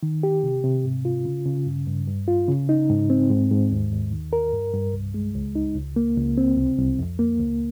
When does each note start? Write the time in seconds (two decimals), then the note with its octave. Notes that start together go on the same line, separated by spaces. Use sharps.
0.03 D#3
0.23 G4
0.43 C3
0.64 C3
0.84 G#2
1.05 F4
1.25 C#3
1.46 C#3
1.66 G2
1.87 G2
2.07 G2
2.28 F4
2.48 C#3
2.69 D#4
2.89 G#2
3.10 C4
3.30 G#2
3.51 G#2
3.71 D#2
3.92 D#2
4.12 D#3
4.33 A#4
4.53 G2
4.73 G2
4.94 C2
5.14 G#3
5.35 C#2
5.55 D#4
5.76 C#2
5.96 A#3
6.17 C#2
6.38 C4
6.57 C2
6.78 C2
6.99 F2
7.19 A#3
7.40 C#2